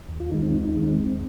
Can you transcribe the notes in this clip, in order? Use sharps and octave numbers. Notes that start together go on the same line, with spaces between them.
D#2
F4
D#3 G#3 D#4
C4
D#2 D#4
D#4
D#3 G#3
C4
D#2